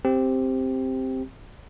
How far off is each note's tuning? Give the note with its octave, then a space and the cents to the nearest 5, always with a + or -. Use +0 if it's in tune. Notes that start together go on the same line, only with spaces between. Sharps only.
C4 +0 G4 +0